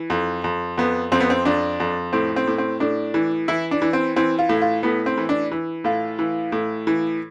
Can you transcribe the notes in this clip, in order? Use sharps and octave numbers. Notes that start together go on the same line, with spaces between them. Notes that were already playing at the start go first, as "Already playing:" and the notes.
Already playing: E3
F2
F2
F2 B3
F2 C4
B3
C4
F2 D4
F2
A2 C4
C4
A2
C4
A2 D4
E3
E3 E4
D4
E3
C4
E3 C4
F4
A2
F4
A2 B3
C4
E3
D4
E3
A2 F4
E3
A2
E3